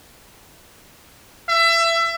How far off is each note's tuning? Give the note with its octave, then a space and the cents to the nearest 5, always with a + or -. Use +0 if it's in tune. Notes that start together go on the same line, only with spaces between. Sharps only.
E5 +25